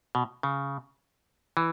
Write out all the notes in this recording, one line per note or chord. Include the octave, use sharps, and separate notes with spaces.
B2
C#3
E3